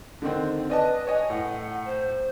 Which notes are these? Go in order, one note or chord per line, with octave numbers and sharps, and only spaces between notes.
D3 D#3 C4
B4 D5 D#5 A5
C#5 D#5 G#5
A2 F#5
C5